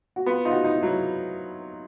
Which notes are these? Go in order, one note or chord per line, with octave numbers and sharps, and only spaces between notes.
F#4
B3 F4
D#4 F4
F#4
D#4
E4
F#3